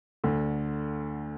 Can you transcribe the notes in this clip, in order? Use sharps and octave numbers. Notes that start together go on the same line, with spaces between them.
D2 D3